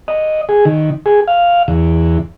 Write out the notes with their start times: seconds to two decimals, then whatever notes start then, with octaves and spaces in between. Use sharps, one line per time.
0.08 D#5
0.49 G#4
0.65 D#3
1.06 G#4
1.28 F5
1.68 E2